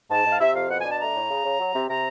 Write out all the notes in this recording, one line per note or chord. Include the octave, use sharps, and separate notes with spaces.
G#2 A5
G#2 F5
C3 E5
F2 F5
B2 F#5
D4 G#5
A5
A3 A#5
A2
C#3
C#3
F#3
C3
C3 A#5